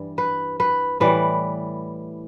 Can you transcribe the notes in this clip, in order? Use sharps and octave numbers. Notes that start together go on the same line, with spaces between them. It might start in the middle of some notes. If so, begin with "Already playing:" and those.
Already playing: G2 E3 G3
B4
B4
A2 E3 G3 B4